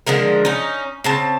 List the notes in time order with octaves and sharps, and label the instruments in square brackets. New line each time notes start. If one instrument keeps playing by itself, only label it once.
[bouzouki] D3 F3 G#3 A#4
C#4 D#4
C#3 C4 A5